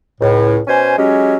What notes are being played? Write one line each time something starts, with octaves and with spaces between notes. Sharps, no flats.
C#2 A2
B2 C#4 C5 G#5
F#3 G#3 C#4 G4